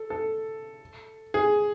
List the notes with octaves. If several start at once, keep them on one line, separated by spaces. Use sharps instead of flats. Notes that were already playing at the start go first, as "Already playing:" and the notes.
Already playing: A4
A4
G#4